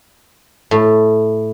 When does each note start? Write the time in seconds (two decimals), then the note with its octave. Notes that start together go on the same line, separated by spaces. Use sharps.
0.71 A2